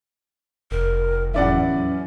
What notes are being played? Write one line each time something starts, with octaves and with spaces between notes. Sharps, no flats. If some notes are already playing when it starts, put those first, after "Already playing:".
F1 A#4
E2 A2 F#3 C#4 E4 D5 F#5